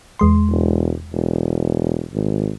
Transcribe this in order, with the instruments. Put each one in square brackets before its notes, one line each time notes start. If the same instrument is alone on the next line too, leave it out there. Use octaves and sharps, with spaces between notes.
[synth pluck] E2 G#3 C6
[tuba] E1
E1
G#1